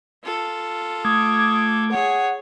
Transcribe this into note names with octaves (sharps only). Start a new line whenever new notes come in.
F4 A4
A3 D6 D#6 G#6
G#4 C#5 F#5